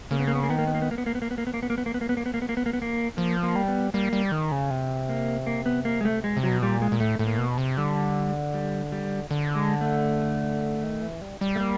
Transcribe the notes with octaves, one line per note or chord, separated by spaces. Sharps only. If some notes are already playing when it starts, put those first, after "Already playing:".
C#3 A#3
B3
A#3
B3
A#3
D#3 B3
A#3
B3
A#3
B3
A#3
B3
A#3
B3
A#3
B3
A#3
B3
A#3
B3
A#3
B3
A#3
B3
A#3
B3
A#3
B3
A#3
B3
A#3
B3
A#3
B3
A#3
F3 A#3
A#3
G3
B3
G3 A#3
G3
D#3
C#3
C3
A#3
A#3
B3
A#3
G#3
A3
B2 G#3
C3
F#3
B2
A#2 G3
G#3
A#2
A2 A3
A2 A3
A#3
B2
C3
D3 G3
G3
G3
D3
G#3
A3
D#3
E3
G3
G3
A3
A#3